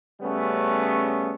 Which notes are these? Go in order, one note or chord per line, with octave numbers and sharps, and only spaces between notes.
C#3 G3 A3 B3 C#4